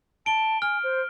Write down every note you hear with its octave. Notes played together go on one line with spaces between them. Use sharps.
A5 D7 G7
G#5 F6
C5